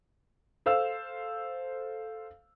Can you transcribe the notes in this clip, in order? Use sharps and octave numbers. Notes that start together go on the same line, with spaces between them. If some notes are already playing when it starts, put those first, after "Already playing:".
A4 C5 F5 E6